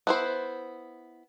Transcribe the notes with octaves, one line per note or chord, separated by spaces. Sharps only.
B3 E4 C5